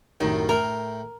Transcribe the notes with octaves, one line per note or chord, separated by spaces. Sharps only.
C2 F#2 A2 D#3
A2 A#4 G5